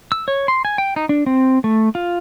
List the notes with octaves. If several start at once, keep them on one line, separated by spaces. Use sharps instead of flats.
E6
C#5
C6
G#5
G5
D#4
D4
C4
A3
F4